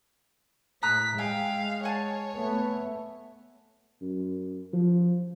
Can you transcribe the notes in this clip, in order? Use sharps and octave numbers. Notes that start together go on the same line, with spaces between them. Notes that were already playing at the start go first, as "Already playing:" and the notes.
A2 A#5 D#6 F#6 B6
G#3 E5 F5 G5 G#5
C#5 F#5 G#5 A5
A3 B3
F#2
F3